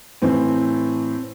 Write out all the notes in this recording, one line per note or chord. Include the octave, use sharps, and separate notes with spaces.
A2 E3 C4